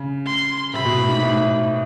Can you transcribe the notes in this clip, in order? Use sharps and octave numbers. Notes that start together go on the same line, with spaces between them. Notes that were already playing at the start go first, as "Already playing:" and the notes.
Already playing: C#3
C6
C3 B5
B2
A2
G#2
A2
G#2
A2